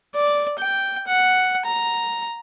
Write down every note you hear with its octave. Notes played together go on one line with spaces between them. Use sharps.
D5
G5
F#5
A#5